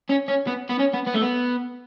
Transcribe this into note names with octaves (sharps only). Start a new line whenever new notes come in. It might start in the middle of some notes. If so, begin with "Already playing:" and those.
C#4
C#4
B3
B3
C#4
B3
B3
A3
B3